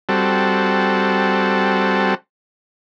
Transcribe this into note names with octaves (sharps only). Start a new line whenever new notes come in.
G3 C4 F#4 A4